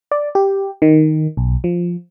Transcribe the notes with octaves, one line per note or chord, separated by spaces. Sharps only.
D5
G4
D#3
B1
F3